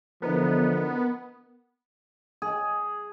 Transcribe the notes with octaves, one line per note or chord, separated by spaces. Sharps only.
D3 E3 F3 B3 A#4 B4 D#5
G#4